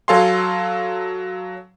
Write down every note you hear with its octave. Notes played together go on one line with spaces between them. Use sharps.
F#3 A4 F5 G#5 C6